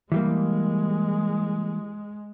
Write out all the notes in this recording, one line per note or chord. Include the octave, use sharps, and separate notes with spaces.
E3 G3 G#3 A#3